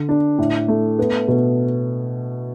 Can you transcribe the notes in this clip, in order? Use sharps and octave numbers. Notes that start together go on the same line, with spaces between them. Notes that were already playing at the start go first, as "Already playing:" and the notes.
Already playing: D3
D4
A2
A3
B3
B2